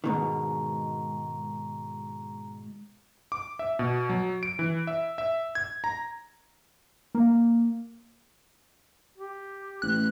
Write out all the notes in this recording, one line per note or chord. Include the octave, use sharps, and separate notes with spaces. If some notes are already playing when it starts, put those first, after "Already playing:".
G#2 B2 D#3 A#5 C#6
D6
E5
B2
F#3
D7
E3
E5
E5
G#6
A#5
A#3
G4
A1 F#6